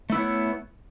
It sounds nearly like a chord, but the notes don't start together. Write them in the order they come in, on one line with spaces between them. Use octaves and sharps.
A3 E4 B3 C#5